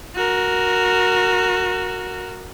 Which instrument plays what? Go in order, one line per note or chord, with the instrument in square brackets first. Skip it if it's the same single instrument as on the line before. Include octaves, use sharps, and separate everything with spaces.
[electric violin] F#4 A#4